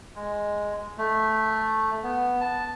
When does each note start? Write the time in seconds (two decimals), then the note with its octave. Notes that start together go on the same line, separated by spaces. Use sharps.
0.16 G#3
0.98 A3
2.03 B3
2.41 A5